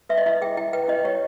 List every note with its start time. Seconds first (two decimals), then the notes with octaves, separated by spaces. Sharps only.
0.09 B4 E5
0.18 D#5
0.26 E4 E5
0.41 G#4 G5
0.57 E4 G5
0.73 B4 G5
0.88 E4 D#5
1.05 G4 C#5